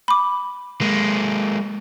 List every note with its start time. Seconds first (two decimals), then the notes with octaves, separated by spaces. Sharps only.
0.08 B5 D6
0.81 G#3 A#3